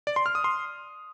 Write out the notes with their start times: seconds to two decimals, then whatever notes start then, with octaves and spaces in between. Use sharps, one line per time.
0.07 D5
0.16 C6
0.26 F6
0.35 D#6
0.44 C6